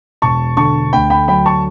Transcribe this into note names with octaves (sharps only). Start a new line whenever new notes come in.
E1 A5 C#6
D3 A5 C#6
D2 G5 B5
G5 B5
F#3 G5 B5
A5 C#6